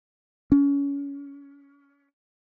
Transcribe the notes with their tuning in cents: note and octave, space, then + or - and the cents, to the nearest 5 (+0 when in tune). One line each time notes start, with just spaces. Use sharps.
C#4 +25